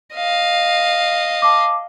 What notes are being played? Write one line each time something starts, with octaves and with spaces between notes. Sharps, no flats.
D#5 F5
A5 D6